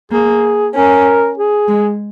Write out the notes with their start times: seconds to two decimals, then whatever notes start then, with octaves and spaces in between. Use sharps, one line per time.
0.12 A#3 G#4
0.75 C#4 A#4
1.38 G#4
1.68 G#3